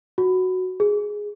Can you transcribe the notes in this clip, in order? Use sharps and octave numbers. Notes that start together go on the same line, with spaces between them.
F#4
G#4